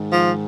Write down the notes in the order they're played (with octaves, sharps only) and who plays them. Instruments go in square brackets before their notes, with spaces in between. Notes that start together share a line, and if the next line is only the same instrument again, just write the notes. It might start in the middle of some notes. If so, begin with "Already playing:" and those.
Already playing: [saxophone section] G#2 D#3
F3